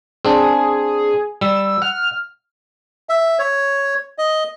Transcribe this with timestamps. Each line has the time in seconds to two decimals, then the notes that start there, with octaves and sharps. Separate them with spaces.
0.25 C4 D4 G#4
1.41 G3 E6
1.82 F#5 F6
3.09 E5
3.39 C#5
4.18 D#5